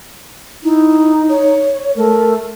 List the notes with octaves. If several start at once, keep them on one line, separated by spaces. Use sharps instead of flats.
D#4 E4
C#5
A3 A#4